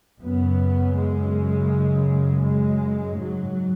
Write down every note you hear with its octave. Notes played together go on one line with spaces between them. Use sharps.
F#2 C#3 B3
G#3
G#3
G#2 F#3